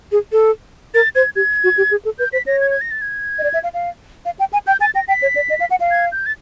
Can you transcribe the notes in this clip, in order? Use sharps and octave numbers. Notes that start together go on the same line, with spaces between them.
G#4
A4
A#4 A6
C5 G#6
G4 G#6
F#4
G4
G#4
A4
B4 G6
C5 B6
C#5 A#6
G#6
G#6
A#6
A6
G#6
D#5
D5
E5
F5
F5
F5
G5
G#5
G5 G6
G#5 A6
G5 A#6
G5 B6
C#5
D5
D#5
F5
F#5
F5
G#6
G6
A6